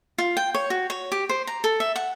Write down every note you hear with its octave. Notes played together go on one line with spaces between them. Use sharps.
F4
G5
C#5
F#4
C#5
G4
C5
A#5
A4
E5
F#5